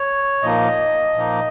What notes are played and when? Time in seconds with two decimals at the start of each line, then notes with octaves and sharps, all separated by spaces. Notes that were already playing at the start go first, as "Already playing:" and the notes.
Already playing: C#5
0.42 A#2 F3 A#3 D#4 D#5
1.15 A#2 F3 A#3 D#4